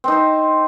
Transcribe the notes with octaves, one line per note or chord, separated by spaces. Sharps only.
C4 D#4 C5